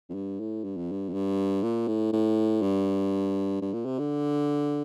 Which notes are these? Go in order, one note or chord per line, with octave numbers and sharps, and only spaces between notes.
F2
G2
A2
G2
F2
G2
F2
G2
A#2
A2
A2
G2
G2
A#2
C3
D3